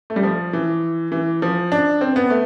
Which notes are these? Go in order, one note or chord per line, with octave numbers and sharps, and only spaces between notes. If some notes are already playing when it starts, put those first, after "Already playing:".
A3
G3
F3
E3
E3
F3
D4
C4
B3
A3